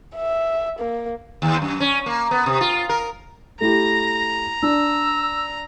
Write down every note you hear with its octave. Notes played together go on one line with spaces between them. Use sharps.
E5
A#3
D#2
F#2
C#4
A#3
B3
C3
F4
A#4
A3 E4 G4 A#5 A#6
D4 E6